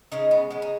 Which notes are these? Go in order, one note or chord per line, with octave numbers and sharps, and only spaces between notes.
C#3 G#3 D#4
B3
C#3 G#3 B3
D#4